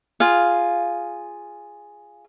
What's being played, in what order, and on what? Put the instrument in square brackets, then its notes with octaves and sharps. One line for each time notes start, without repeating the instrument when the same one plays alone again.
[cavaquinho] F4 G#4 F5